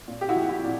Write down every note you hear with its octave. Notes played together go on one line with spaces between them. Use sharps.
A#2
G4
E4 F#4
F3
E4 F#4
A#2